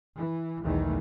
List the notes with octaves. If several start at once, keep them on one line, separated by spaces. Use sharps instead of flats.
E3
B1 E2 D#3 E3 A3